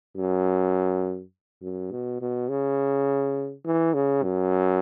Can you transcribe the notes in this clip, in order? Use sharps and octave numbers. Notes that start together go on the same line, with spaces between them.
F#2
F#2
B2
B2
C#3
E3
C#3
F#2